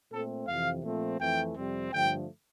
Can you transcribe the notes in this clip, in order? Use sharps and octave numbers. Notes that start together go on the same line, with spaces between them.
A#2 A3 C4 A4
F2 C3 E3 F5
A#2 F3 A3 C4
F2 E3 A3 C4 G5
F2 C3 G3 C4
G2 D3 F3 A3 G5